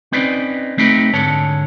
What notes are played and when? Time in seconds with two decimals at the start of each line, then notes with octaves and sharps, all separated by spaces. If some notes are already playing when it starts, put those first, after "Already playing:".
0.12 C4 C#4 D#4 B4 D5
0.78 A3 C4 D#4 G4 B4
1.14 G#2 D3 C#5 A5